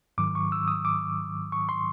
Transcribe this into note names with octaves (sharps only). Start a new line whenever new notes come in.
G#2 D#3 F#3 D6
C#6
E6
D#6
D6
C#6
C6